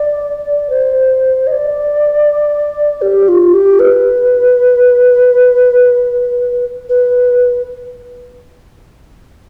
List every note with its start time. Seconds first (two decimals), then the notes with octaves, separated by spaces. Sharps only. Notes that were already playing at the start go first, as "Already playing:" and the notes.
Already playing: D5
0.70 C5
1.47 D#5
1.52 D5
3.02 G4
3.28 F4
3.54 G4
3.79 B4
6.89 B4